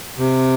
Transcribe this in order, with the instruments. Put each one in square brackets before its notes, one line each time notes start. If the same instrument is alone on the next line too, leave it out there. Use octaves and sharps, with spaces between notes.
[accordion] C3